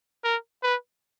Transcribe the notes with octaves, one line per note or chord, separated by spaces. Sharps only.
A#4
B4